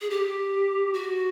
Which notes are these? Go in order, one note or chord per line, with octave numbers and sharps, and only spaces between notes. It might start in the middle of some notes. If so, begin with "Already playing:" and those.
G#4
G4
F#4